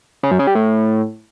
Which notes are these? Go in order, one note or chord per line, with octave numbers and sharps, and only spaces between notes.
C#3
F#2
C#3
G3
A2